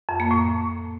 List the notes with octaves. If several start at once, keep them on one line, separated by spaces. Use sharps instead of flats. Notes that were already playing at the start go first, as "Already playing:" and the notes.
F2
A#3
A2